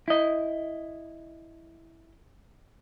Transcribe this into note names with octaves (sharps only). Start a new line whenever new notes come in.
E4 D#5